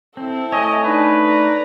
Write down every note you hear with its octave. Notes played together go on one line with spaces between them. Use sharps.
C4 E4 A4
A3 C#5 D#5 G#5
D4 D#4 B4
D5 A#5